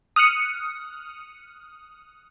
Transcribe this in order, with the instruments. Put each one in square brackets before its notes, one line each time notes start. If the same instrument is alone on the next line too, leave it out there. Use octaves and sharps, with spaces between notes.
[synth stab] D#6 F6 F#6 C#7